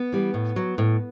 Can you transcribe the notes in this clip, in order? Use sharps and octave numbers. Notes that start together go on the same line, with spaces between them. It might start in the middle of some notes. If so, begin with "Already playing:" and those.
Already playing: B3
E3 G3
A2
F#3
A2